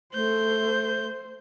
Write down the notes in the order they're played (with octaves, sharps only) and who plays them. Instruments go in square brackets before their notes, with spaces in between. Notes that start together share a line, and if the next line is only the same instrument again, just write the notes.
[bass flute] A3 [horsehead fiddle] C5 [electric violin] G6